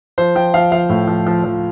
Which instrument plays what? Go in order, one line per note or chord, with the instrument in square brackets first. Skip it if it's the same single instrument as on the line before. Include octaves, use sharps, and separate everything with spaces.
[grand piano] F3 C5
F3 G5
F3 F5
F3 F5
A2
F3
F3
F3